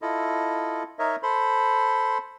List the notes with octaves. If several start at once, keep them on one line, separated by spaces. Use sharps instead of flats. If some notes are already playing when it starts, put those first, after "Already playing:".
E4 F4 A4 D#5
D#4 A#4 C#5 D#5 E5
A4 C5 B5 C6